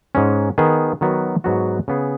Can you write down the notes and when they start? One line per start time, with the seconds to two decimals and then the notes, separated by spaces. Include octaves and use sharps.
0.15 G#2 G#3 C#4
0.58 D#3 B3 G#4
1.01 D#3 F#3 B3 F#4
1.44 G#2 F#3 B3 F#4
1.88 C#3 B3 G#4